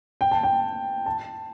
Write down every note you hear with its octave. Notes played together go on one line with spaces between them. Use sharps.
G5
A5
G5
A5